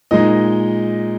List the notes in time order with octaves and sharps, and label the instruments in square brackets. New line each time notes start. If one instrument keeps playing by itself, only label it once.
[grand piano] A#2 G#3 D#4 D#5